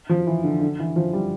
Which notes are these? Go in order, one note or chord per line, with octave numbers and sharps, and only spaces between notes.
F3
E3
D3
D3
E3
F3
G3